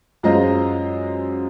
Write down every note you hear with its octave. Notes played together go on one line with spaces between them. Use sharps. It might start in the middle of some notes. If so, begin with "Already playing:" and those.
F#2 G#3 F4 C5 D#5 A#5